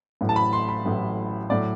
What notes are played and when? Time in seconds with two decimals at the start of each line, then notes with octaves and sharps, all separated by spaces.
0.21 A1 A2 F#3
0.29 A5
0.36 B5
0.53 C6
0.69 B5
0.85 A1 A2 F#3
1.50 A2 F#3 D5